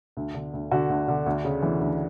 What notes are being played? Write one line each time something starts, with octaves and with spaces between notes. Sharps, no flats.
D2
D3
D2
D3 F#4
D2
D3
D2
C#3
E3
D2